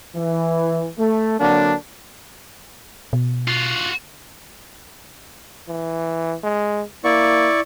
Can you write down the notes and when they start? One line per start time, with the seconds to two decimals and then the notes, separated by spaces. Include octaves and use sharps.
0.15 E3
0.98 A3
1.40 D3 F#3 A#3 C4 D4
3.13 B2
3.48 F4 F#4
5.68 E3
6.43 G#3
7.04 A#3 E4 D5 C#6